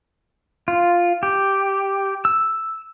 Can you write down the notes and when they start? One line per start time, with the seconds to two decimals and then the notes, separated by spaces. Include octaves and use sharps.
0.68 F4
1.23 G4
2.25 E6